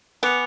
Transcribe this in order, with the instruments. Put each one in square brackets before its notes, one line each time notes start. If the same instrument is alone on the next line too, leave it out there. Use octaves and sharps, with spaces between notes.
[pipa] B3 [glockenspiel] G#5 D6 F#6 C#7 F7